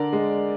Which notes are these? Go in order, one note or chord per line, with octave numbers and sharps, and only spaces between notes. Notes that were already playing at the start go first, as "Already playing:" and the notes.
Already playing: D3 A#4 D5
G#3